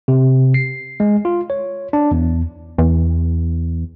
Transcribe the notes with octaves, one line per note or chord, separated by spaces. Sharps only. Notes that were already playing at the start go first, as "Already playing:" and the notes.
C3
C7
G#3
F4
C#5
D4
E2
E2